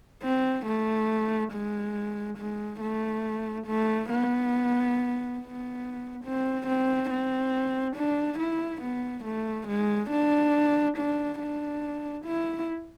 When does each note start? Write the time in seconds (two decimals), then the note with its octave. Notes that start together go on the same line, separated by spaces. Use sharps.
0.23 C4
0.67 A3
1.53 G#3
2.38 G#3
2.81 A3
3.67 A3
4.10 B3
5.39 B3
6.25 C4
6.67 C4
7.10 C4
7.96 D4
8.39 E4
8.82 B3
9.25 A3
9.68 G#3
10.11 D4
10.97 D4
11.40 D4
12.25 E4